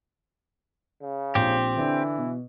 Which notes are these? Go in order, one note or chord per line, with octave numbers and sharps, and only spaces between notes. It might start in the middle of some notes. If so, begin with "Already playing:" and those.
C#3
A#1 C4 G4
D3 E3 D4
B2